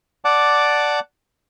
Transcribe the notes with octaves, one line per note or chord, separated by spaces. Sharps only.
D5 F#5 A5 D6